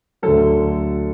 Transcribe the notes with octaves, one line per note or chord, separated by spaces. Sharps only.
D2 D3 F#3 A4